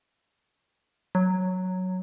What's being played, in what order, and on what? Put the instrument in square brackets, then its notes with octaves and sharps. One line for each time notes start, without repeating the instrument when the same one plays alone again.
[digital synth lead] F#3